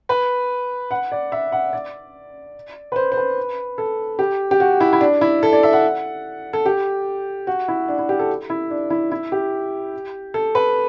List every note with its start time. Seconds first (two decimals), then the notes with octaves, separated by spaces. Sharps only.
0.09 B4
0.91 F#5
1.12 D5
1.32 E5
1.52 F#5
1.73 D5
2.92 B4
2.96 C5
3.12 C5
3.17 B4
3.78 A4
4.19 G4
4.51 G4
4.60 F#4
4.80 E4
4.93 E4
5.01 D4
5.21 E4
5.43 A4
5.53 D5
5.63 E5
5.73 F#5
6.53 A4
6.66 G4
7.47 F#4
7.68 E4
7.88 D4
7.98 E4
8.09 G4
8.19 A4
8.50 E4
8.71 D4
8.90 E4
9.11 E4
9.32 G4
10.34 A4
10.55 B4